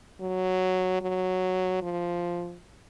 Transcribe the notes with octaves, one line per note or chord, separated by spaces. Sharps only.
F#3
F#3
F3